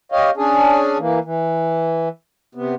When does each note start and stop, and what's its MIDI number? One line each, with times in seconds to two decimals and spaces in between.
0.12 0.30 67
0.12 0.30 73
0.12 0.30 75
0.12 0.30 77
0.37 0.98 61
0.37 0.98 62
0.37 0.98 68
0.99 1.19 52
0.99 1.19 58
1.25 2.09 52
2.55 2.75 48
2.55 2.75 59